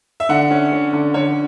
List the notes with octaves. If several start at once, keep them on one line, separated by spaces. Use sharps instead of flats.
E5
D3 F#5
C#4
C#4
D3
D3 C#5